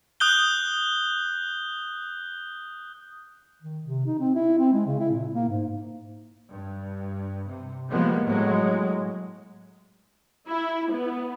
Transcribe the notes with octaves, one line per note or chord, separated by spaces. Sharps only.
D#6 F#6 G6 G7
D#3
C3
D#4
C4
E4
C4
G#3
C#3
E4
A#2
A#3
G#2
G2
C3
F3 G3 G#3 A#3 B3
A2 F#3 G#3
E4
B3